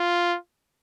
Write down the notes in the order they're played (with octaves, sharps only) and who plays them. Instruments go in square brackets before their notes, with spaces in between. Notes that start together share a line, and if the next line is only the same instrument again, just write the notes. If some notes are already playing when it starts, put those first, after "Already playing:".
Already playing: [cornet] F4